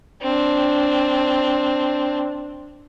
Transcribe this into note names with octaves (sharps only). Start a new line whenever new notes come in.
C4 D4